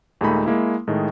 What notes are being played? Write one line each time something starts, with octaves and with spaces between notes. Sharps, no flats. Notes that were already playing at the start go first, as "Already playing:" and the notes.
D#2 A#2 G#3 A3 D#4 B5
G#3 A#3 E4
A2 D#3 G#3